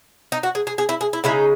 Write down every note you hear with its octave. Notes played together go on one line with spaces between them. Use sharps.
D#4
F#4
G#4
G#4
G#4
E4
G#4
E4
C#3 G#3 D#4 E4